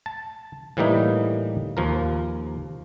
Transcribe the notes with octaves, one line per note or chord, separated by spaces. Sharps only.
A5
A2 E3 G3 A#3 D#4
D#2 F3 A#4